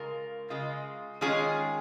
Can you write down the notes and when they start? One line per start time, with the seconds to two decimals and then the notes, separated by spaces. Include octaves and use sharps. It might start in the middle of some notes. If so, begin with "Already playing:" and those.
Already playing: C#3 G#3 F4 A#4
0.50 C#3 G#3 F4
1.21 D#3 G#3 C#4 F4 G#4